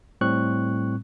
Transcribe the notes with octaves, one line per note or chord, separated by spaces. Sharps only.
A2 G3 C4 C#6 F#6